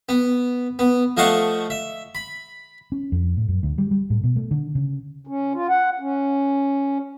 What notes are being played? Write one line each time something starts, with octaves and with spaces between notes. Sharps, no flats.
B3
B3
F3 A3 D#5 F5 F#5 C#6
E5
B5
C#4
F2
A2
F#2
D2
G3
G3
A2
B2
A3
D3
C#3
C#4
F4
F#5
C#4